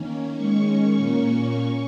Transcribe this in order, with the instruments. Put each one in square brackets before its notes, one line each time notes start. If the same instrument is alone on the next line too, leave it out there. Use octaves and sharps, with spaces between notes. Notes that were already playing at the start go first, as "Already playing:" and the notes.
Already playing: [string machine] D#3 A#3 C#4
D#3 G#3 C#4 C#6
A#2 A#3 C#4
C#4